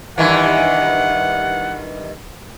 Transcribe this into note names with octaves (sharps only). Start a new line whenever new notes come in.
G2 D#3 E3 F#5